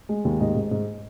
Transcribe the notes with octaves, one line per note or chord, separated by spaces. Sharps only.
G#3
D#2
G#2 D#5
G#2
G#2